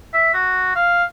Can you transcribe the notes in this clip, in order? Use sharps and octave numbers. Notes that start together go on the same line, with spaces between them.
E5
F#4
F5